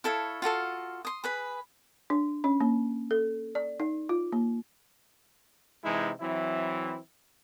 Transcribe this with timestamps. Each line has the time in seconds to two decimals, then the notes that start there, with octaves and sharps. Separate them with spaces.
0.04 E4 A4 C#5 F5
0.42 F4 F#4 A4 F5
1.05 C6 D#6
1.24 G#4 B4 B5
2.10 D4
2.44 C#4
2.60 A#3
3.11 A4
3.55 D5
3.80 D#4
4.09 F4
4.32 A#3
5.84 C3 E3 G#3 D#4 E4
6.21 E3 F#3 C4 E4